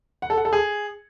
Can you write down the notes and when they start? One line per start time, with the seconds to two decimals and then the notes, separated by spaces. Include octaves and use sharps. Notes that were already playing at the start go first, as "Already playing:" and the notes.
0.22 F#5
0.30 A4
0.37 F#5
0.45 A4
0.53 G#4